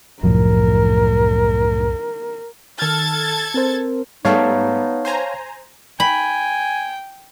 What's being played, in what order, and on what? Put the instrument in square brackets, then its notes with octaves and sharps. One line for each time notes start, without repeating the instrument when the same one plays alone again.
[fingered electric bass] C2 F#2 [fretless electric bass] A2 F3 F#3 [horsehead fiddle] A#4
[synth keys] D#3 F6 [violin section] A4 G#6 A6
[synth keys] C4 A#4 C5
[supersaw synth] G#2 G3 A3 [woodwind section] B3 D#4 [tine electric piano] C#5 F5 A5
[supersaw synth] C5 G#5 A#5
[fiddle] G5 [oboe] G#5 [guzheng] B5